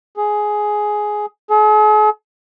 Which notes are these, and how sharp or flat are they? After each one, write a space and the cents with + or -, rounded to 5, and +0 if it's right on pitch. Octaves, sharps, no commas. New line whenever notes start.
G#4 +10
G#4 +45